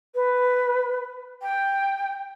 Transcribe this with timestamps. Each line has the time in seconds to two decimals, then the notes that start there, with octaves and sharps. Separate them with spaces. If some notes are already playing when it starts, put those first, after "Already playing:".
0.15 B4
1.42 G5